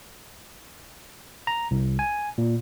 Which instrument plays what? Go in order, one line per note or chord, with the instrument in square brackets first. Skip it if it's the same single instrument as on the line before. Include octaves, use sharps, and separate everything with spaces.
[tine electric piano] A#5
C2
G#5
A#2